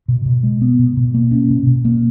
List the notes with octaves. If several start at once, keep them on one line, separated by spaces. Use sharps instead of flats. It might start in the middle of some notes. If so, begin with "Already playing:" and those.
B2
B2
G#3
B3
B2
B2
A#3
C#4
B2
B2
A#3